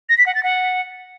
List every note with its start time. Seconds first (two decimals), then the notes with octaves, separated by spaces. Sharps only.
0.09 A#6
0.18 B6
0.26 F#5
0.35 A6
0.43 F#5